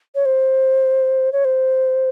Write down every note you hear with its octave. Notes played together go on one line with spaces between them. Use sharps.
C#5
C5
C#5
C5